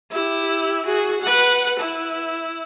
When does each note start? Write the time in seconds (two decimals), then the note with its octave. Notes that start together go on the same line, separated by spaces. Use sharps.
0.11 E4 G4
0.85 F#4 G#4
1.21 B4 F#5
1.79 E4